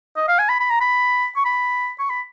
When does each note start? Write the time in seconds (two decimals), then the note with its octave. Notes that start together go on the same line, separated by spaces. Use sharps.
0.17 D#5
0.28 F5
0.39 G#5
0.49 B5
0.60 B5
0.70 A#5
0.81 B5
1.36 C#6
1.45 B5
1.99 C#6
2.10 B5